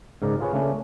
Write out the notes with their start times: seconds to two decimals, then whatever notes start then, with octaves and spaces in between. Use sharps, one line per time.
0.22 G#2 C#3 A#4 D5
0.40 F4 G#4 B4 C#5
0.53 C#3 A3 A#3 C#4 D4